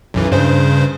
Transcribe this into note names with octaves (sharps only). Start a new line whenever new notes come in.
B1 F#2 E3
G2 C#3 C5